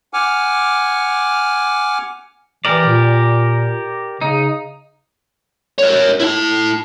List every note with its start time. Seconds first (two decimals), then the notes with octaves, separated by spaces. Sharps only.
0.13 F#5 G#5 D6 F6
2.65 E3 G4 A#4 D5
2.86 A#2
4.21 C#3 D#4
5.78 A#4 C#5
6.20 E4 A5